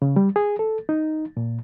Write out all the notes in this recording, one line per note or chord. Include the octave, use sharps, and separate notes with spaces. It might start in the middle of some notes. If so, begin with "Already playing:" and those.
C#3
G3
G#4
A4
D#4
A#2